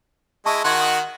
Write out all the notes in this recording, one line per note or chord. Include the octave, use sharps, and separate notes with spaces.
G#3 E4 D#5 A5 C#6
D#3 F#4 F#5 C6 G#6
D#6